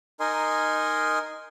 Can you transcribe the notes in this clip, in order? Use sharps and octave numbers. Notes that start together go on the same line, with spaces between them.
D#4 A#4 D#5 G#5 C6